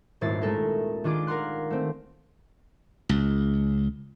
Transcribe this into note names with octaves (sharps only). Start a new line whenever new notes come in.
D#1 G#1 E4 A6 C7
G#3 A3 A4 A#4
D#3 D4 F4 G#4 D6
A#4 F5 F#5 C6 F#6
A3 C4
C#2